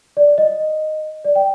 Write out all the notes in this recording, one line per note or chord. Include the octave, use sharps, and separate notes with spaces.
D5
D#5
D5
G5